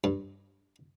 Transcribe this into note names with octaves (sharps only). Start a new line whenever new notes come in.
G2